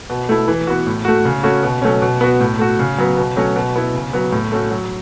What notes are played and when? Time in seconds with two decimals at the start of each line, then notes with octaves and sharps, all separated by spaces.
0.10 B2
0.29 A3 E4
0.48 E3
0.67 B3 F#4
0.87 A2
1.05 A3 F#4
1.25 C#3
1.43 A3 C#4 F#4
1.63 B2
1.82 F#3 A3 C#4
2.02 B2
2.21 B3 F#4
2.40 A2
2.59 A3 F#4
2.79 C#3
2.98 F#3 B3
3.17 B2
3.36 F#3 A3 C#4 F#4
3.56 B2
3.76 B3 E4
3.95 C#3
4.13 F#3 B3
4.32 A2
4.52 A3 C#4 F#4
4.71 F#3